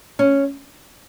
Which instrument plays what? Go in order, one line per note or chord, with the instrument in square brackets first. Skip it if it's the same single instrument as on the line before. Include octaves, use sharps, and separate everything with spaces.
[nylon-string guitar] C#4